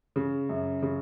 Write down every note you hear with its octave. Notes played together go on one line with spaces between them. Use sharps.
C#3
F#2
C#3